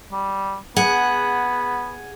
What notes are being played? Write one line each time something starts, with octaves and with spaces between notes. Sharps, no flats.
G3
B3 G#4 F#5